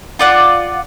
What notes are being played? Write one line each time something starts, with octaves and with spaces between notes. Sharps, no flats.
F4 D5 F#5